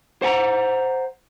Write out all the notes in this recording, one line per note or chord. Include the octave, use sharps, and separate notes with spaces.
C5 F#5 G#5 A#5